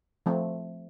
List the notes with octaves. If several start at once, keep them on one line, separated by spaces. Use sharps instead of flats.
F3 A3 C4